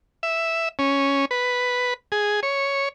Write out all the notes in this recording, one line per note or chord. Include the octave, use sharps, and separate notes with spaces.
E5
C#4
B4
G#4
C#5